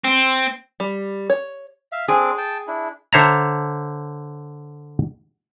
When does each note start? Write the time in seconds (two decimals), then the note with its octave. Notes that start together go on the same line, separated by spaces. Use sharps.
0.04 C4
0.80 G3
1.30 C#5
1.92 E5 F5
2.08 C4 D4 G#4 D6
2.38 G5 A5
2.67 D4 E4
3.13 D3 C5 C#5 E5 A5 A#5